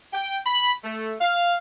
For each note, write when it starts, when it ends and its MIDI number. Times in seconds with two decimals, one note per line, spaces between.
0.13 0.38 79
0.46 0.72 83
0.84 1.14 57
1.20 1.54 77